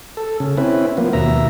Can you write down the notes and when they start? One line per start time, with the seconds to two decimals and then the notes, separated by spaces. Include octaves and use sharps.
0.17 A4
0.40 C#3
0.57 C4 C#4 E4 B4
0.97 F3 A#3 B3
1.13 D#2 B2 E5 A#5